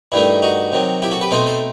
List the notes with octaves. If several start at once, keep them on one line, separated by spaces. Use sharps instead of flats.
G2 D#3 A3 D#4 E4
D#4 F#4
C3 D#3 F#3
E4 G4
F#4 A4
G4 B4
B2 A3 C4 D#4 A4 C5
A4 C5